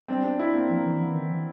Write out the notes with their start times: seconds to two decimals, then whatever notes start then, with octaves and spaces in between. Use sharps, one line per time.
0.08 G3 C4 D4
0.24 C4 D4
0.38 D4 E4
0.54 A#3 C4
0.70 F3 A#3
0.85 E3
0.99 E3 B3
1.14 D#3
1.30 E3